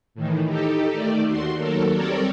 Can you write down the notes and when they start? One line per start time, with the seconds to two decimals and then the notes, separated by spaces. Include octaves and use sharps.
0.15 A2 D#3 E3
0.46 D#4 G4 A4
0.93 D#3 A3 D5
1.28 D#2 F#4 C6
1.57 D#2 F#3 A4 A#4
1.94 G3 C4 A4 A#4 C#5 D5